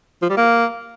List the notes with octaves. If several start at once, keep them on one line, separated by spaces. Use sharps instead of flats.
F3
G3
A#3